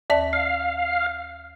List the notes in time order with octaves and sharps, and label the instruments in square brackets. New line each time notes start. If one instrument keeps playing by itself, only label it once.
[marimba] D#2 D5 A5
[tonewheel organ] F5